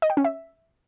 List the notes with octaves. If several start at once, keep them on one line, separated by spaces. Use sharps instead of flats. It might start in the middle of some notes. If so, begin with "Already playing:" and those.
D#5
G5
C#4
E5